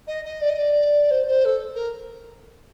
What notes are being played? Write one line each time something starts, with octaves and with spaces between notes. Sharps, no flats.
D#5
D#5
D5
D#5
D5
C5
C5
A4
A#4